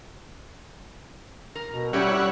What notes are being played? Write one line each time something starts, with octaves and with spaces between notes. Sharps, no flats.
A#4
B2
A2 G3 C#4 E4 G4 C#5 F#5